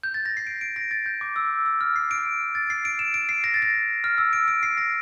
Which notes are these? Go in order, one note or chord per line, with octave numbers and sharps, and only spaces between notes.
G6
A6
A#6
C7
D7
D7
A#6
A6
G6
D6
E6
E6
F6
C7
D7
A6
C7
D7
E7
D7
C7
A#6
A6
A#6
F6
E6
D7
D7
C7
A#6